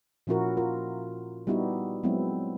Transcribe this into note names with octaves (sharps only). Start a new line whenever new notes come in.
A#2 F3 C#4 E4 F#4 A#4
F4 A#4
G3 B3 D#4 E4 F#4 G4
F#3 G#3 B3 C4 E4